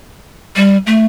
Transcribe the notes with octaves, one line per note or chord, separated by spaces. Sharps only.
G3
A3